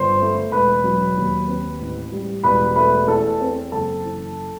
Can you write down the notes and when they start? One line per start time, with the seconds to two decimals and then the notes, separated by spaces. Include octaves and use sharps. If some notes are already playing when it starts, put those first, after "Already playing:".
Already playing: G1 C5 C6
0.20 A3
0.52 E1 B4 B5
0.84 F#3
1.17 D#2
1.47 C4
1.80 A1
2.12 G3
2.43 E1 B4 B5
2.76 A3 B4 B5
3.08 E2 A4 A5
3.41 C4
3.72 F#1 A4 A5
4.04 E3